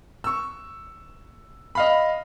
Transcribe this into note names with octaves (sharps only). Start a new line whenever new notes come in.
C#6 E6
D#5 F5 B5